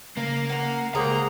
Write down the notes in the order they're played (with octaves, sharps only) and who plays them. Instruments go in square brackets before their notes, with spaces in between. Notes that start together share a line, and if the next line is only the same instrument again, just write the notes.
[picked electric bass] C#3 [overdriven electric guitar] A#3 A#4
[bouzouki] F#5 A#5
[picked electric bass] C#2 [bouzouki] G3 G#4 C5 [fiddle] A#3 F#5 [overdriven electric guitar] A#5